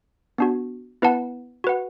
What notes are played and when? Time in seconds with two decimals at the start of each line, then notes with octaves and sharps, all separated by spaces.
0.38 B3 D4 F#4
1.02 B3 E4 B4 F#5 A5
1.64 F#4 B4 F#5